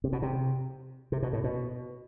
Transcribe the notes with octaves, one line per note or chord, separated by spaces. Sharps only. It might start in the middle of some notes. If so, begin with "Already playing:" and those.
C3
B2
C3
C3
B2
A2
B2